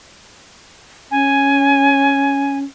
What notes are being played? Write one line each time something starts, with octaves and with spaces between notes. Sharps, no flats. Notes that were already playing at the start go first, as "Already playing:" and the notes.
C#4 G#5